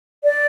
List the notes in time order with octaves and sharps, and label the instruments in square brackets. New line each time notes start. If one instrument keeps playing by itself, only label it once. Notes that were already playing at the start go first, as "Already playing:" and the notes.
[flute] D5